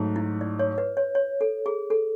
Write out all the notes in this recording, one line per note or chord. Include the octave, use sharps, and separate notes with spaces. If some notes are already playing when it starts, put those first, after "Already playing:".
Already playing: G#2 F#3 A3
E4
D5
C#5
B4
C#5
C#5
A4
G#4
A4